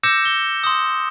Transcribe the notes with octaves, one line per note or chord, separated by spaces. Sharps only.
D6 E6 G6 A#6 C#7 E7
G7
C6 D#6